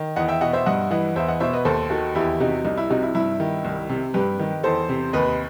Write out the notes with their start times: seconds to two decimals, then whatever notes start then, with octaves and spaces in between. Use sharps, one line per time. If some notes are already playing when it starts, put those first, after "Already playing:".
Already playing: D#3
0.16 E2 D#5 F#5
0.28 E5 G5
0.41 B2 D#5 F#5
0.53 C5 E5
0.66 G2 D#5 F#5
0.91 E3 D#5 F#5
1.16 E2 C5 E5
1.28 D#5 F#5
1.40 B2 C5 E5
1.53 B4 D#5
1.65 D#2 A4 C5
1.90 D#3 F#4 A4
2.15 E2 E4 G4
2.40 C3 D#4 F#4
2.65 C2 D#4
2.77 E4
2.90 C3 D#4 F#4
3.03 E4
3.15 G2 E4
3.40 D#3
3.65 C2
3.89 C3
4.14 G2 G4 B4
4.39 D#3
4.63 E2 A4 C5
4.89 C3
5.13 D#2 B4 D#5